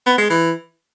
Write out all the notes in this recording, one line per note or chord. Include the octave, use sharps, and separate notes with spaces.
B3
G#3
E3